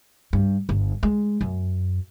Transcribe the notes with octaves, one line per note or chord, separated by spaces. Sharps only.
G2
G1
G#3
F#2